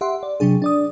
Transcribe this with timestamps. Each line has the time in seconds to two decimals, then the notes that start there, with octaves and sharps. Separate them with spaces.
0.01 G4 E5 F#5 C6
0.23 D5
0.40 C3 F#3 D4 G#4
0.62 D4 D5 D#6